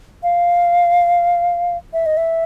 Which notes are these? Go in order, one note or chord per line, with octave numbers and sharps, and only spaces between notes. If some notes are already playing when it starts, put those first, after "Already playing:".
F5
E5
D#5
E5